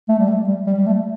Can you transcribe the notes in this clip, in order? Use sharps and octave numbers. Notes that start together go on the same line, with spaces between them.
A3
G3
A3
G3
G3
G3
A3